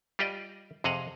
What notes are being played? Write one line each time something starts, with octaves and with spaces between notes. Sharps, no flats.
G3 F4 G4 D5 D#5
F2 C3 G#4 D#5 F5 F#5